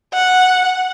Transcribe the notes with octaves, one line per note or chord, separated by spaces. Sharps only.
F#5